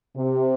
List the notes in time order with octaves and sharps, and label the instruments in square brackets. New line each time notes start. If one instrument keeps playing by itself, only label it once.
[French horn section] C3